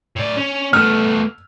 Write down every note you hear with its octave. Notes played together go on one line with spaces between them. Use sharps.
A2 D5
C#4
A3 B3 F6